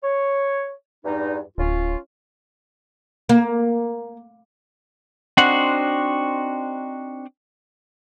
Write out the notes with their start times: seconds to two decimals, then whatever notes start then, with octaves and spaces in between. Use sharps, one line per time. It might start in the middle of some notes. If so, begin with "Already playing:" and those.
0.03 C#5
1.04 E2 G2 D#4
1.58 D1 C#4 F4
3.29 A#3
5.37 C4 D4 D#4 F#4 C5 F#5